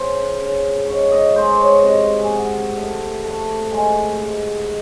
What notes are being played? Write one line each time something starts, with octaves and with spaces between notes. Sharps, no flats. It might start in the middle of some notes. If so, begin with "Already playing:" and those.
Already playing: C#3 C5
C#3
G#2 C#5
D#5
G#3 C5
C#5
C3 D#5
G#5
C3 F#5
A3 E5
A3
G#3 G#5
G#2
D#3